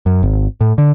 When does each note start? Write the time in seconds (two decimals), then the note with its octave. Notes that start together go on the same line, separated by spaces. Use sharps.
0.06 F#2
0.23 G#1
0.61 A2
0.78 D3